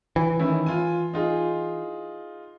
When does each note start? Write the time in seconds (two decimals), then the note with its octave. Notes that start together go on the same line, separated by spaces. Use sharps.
0.16 E3
0.39 D#3 C#4 E4
0.66 F4 G#5
1.14 D#4 F4 G#4